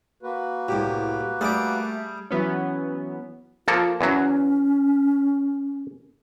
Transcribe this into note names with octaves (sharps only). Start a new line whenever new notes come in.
A#3 F#4 B4
C2 A2 G4
G3 A3 G#4 D6
E3 F#3 B3 C#4
F3 A#3 F4 A4
E2 F#3 C#4